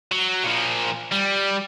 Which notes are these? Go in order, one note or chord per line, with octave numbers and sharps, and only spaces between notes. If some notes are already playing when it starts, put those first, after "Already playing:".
F#3
A#2 F3
G3